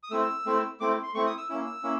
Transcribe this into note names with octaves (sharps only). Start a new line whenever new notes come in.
D#6
A3 C4 E4 E6
A3 C4 E4
A3 C4 E4 D6
C6
A3 C4 E4 C#6
D#6
E6
A#3 C#4 E4
A#3 C#4 E4